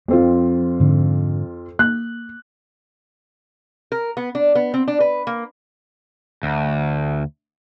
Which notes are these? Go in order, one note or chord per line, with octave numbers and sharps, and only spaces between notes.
F2 F3 C4 F4
G#2 D3
A#3 F#6
A#4
B3
D4
B3
C4
D4
B4
A#3
D2